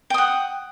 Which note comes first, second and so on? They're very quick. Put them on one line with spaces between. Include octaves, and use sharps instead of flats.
G5 D#6 F#5